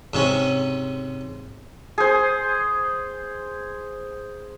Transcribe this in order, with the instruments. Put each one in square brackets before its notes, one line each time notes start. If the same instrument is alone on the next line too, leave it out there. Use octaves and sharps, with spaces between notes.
[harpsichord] G#2 C3 C#4
[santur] G#4 C5